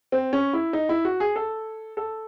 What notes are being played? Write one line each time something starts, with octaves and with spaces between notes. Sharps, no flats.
C4
C#4
E4
D#4
E4
F#4
G#4
A4
A4